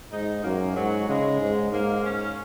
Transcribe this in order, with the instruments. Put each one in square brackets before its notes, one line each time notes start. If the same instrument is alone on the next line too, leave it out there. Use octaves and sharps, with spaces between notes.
[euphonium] G#2 [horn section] D#4
[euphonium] F#2 [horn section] A#3
[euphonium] G#2 [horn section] F#3
[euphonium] C#3 [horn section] G#3
[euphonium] G#2
[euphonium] G#2 [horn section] A#3
[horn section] C#4